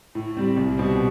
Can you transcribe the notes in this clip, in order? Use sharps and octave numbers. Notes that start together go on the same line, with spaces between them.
A2
G3 C4
C2
B2 G3 C4